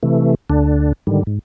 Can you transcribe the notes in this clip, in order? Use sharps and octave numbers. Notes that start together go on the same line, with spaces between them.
C3 E3 A3
D2 D3 D4
G#2 D3 D#3 G3
G#2